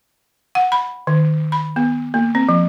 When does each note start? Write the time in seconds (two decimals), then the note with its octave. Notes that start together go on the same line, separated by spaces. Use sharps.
0.55 F#5
0.72 B5
1.07 D#3
1.52 B5
1.76 B3
2.14 A#3
2.35 C4
2.49 F3